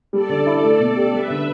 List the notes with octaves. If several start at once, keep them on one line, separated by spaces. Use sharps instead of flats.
G3 A4 D5
D3
E4
A3 A4 D5
B2
G4
G3 B4 E5
D3